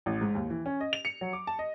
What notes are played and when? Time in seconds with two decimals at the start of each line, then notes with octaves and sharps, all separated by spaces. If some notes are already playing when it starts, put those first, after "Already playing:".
0.06 A1
0.21 G#2
0.35 D#2
0.50 E3
0.66 C#4
0.81 D#5
0.93 F7
1.05 C#7
1.21 F#3
1.33 D6
1.47 A5
1.59 D#5